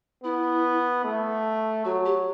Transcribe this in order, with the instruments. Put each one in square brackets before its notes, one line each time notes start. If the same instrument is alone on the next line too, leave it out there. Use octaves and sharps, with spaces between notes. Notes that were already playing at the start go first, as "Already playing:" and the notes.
[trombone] B3 [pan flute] E4
[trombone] A3
[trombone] F#3 [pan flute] F#4
[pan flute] G4